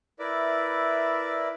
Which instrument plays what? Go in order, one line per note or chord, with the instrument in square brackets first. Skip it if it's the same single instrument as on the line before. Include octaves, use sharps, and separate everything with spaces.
[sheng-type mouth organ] E4 A#4 B4 D5 E5